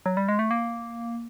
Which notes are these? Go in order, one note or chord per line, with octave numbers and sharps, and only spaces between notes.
F#3
G3
G#3
A3
A#3